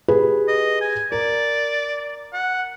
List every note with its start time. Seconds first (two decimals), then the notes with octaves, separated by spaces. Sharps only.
0.08 G4 G#4 B4
0.48 D#5
0.81 G#5
1.12 A#4 D5
2.33 F#5